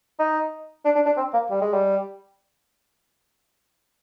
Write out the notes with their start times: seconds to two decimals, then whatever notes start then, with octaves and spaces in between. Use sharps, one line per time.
0.19 D#4
0.85 D4
0.95 D4
1.06 D4
1.17 C4
1.33 A#3
1.50 G3
1.61 G#3
1.73 G3